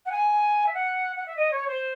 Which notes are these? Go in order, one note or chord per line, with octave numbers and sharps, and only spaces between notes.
F#5
G#5
E5
F#5
F#5
E5
D#5
C#5
C5